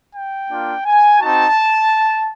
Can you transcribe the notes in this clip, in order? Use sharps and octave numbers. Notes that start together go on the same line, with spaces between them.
G5
A#3 D4 F4
G#5
C4 D#4 F#4 A5